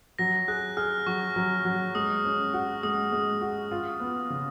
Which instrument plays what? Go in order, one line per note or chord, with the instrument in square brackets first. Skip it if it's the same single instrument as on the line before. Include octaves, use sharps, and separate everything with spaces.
[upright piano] F#3 [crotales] A#6
[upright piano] G#4 [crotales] F#6
[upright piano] G#4 [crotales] F6
[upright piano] F#3 [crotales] C#6
[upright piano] F#3
F#3
[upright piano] G#3 [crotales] D#6
[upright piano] C#4
F#4
[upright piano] G#3 [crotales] D#6
[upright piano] G#3
F#4
F4
B3
C#3